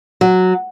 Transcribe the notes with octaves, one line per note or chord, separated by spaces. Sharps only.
F#3